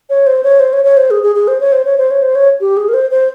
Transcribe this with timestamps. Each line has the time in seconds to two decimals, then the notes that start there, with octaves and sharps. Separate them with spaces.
0.10 C#5
0.27 C5
0.43 C#5
0.59 C5
0.73 C#5
0.84 C#5
0.97 C5
1.10 G#4
1.23 G#4
1.35 G#4
1.47 C5
1.60 C#5
1.72 C5
1.85 C#5
1.98 C5
2.11 C#5
2.22 C5
2.35 C#5
2.60 G4
2.77 G#4
2.88 A#4
2.94 C5
3.10 C5